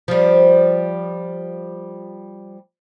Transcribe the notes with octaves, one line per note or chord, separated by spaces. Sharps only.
F3 G3